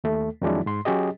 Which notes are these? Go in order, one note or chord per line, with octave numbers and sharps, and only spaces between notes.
D#2 A3
F2 D#3 F#3 G#3 D4 E4
G#2 C6
F#3 C#4 G4 G#4 D#5